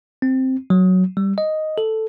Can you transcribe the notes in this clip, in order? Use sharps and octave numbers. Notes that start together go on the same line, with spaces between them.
C4
F#3
G3
D#5
A4